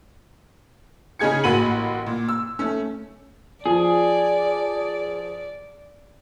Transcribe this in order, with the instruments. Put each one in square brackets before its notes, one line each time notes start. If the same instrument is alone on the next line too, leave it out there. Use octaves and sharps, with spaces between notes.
[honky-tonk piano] C#3 C#4 D#4 G#4 G#6 C#7
A1 A#3 F#4 B5 D#7 F#7
A#2
E6
A3 C#4
[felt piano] F3 [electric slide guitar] G#4 [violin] D5